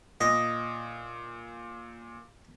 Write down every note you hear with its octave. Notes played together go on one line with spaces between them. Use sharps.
A#2 D#5